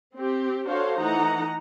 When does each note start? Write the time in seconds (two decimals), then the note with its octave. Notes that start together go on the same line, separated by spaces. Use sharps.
0.15 C4 G4
0.67 D4 F#4 A4 C5 C#5 F5
0.98 E3 A3 D#4 F#5 A#5